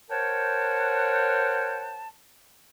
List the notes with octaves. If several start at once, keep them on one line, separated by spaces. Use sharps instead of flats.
A#4 C5 C#5 F#5 G5 A5